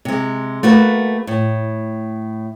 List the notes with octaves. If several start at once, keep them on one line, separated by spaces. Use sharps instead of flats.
C3 G#3
A3 A#3 F#4 B4
A2